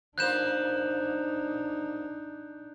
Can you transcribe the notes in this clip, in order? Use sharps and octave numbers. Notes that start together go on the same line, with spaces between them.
F3 A#3 D4 D#4 C5 F#6 G6 E7